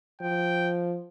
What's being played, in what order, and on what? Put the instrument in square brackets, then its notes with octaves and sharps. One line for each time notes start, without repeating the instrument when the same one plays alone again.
[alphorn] F3 [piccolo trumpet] G5